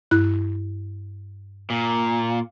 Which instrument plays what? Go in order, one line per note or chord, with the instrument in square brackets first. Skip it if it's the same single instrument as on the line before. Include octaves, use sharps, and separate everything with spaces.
[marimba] G2 E4 F#6
[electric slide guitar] A#2